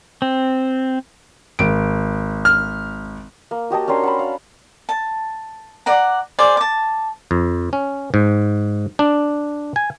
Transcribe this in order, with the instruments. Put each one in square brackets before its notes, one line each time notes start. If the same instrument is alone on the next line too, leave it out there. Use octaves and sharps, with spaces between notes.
[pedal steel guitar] C4
[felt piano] G#1 D7
[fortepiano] F6
[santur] A#3
F#4 G4 D#5 A5
C#4 D4 A#4 C6
F#5 A5 B5
F5
[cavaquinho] A5
D5 F#5 A#5
G#4 C5 D5
A5 D6
[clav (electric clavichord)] F2
C#4
G#2
D4
G#5